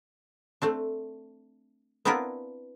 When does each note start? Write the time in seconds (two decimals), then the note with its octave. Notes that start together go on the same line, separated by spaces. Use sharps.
0.62 A3 C4 D4
2.05 B3 C4 D4 E4 F4 A#4